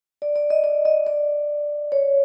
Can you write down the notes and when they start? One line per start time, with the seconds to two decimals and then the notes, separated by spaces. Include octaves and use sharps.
0.22 D5
0.36 D5
0.50 D#5
0.64 D5
0.85 D#5
1.07 D5
1.92 C#5